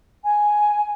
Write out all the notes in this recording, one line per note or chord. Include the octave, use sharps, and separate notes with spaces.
G#5